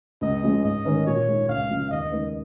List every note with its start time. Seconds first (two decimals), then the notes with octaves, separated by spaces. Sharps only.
0.21 C#2 D#5
0.43 C#3 F3 G#3
0.64 G#2 D#5
0.85 D#3 G#3 C#4 A#4
1.06 A#2 C#5
1.27 G#3 D#4
1.49 C#2 F5
1.70 C#3 F3
1.91 D#2 D#5
2.12 C#3 G#3 D#4 A#4